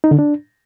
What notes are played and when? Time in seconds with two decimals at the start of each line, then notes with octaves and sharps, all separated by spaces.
0.04 D#4
0.11 D3
0.19 D4